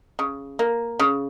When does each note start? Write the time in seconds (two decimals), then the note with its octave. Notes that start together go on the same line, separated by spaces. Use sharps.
0.19 C#3
0.59 A#3
0.99 C#3